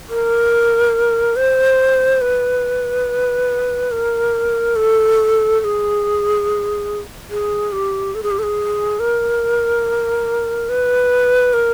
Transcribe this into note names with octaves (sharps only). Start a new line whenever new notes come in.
A#4
C5
B4
A#4
A4
A4
G#4
G#4
G4
A4
G#4
G4
A4
G#4
A#4
B4
A#4